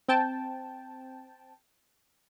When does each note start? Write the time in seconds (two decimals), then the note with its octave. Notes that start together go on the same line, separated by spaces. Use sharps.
0.08 C4 G5 A5